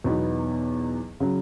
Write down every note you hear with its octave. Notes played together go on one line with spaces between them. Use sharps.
E2 B2 F#3 B3 D#4
C#3 F#3